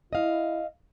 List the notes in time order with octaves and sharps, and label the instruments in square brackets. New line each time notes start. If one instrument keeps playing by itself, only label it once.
[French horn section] E4 [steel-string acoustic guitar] D#5 F5